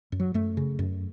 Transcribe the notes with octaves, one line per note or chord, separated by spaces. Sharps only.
F#2
F#3
F#2 A3
C#3
F#2